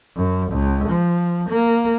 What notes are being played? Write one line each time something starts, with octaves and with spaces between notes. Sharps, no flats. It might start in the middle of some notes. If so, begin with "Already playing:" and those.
F#2
C#2
F3
A#3